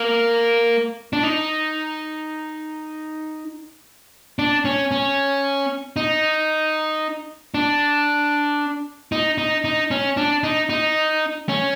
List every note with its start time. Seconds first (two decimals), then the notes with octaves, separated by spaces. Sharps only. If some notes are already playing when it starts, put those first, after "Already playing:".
Already playing: A#3
1.13 D4
1.23 D#4
4.39 D4
4.65 C#4
4.91 C#4
5.96 D#4
7.54 D4
9.12 D#4
9.38 D#4
9.64 D#4
9.91 C#4
10.17 D4
10.43 D#4
10.70 D#4
11.49 C#4